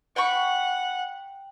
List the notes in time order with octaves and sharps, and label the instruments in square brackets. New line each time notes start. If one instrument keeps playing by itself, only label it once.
[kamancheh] F#5 [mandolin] G5 B5 C#6